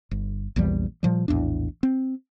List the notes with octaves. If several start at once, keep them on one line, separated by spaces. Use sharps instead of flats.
G1
A#1 E2 E3 G3
A#2 F3 G3
A#1 E2 A2 D4
C4